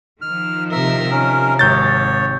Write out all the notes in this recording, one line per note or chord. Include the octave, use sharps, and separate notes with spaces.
D#3 F3 F6
C3 A#4 E5 E6
C3 C#4 A#4
G#1 C#5 G6 A6